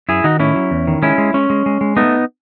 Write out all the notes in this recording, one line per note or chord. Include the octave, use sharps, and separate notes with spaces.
F#2 E4 G#4
D#3 D#4 F#4
A2 C#4 E4
F#3
E2
D#3
G#3 C#4 E4
G#3
G#3 C#4
G#3
G#3
G#3
A3 B3 D#4